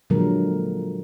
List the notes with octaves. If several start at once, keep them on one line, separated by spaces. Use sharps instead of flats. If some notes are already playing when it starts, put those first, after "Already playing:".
A#2 D3 F3 F#3 G#3 A#4